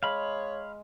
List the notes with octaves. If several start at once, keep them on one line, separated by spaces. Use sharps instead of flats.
G#3 C#5 F5 B5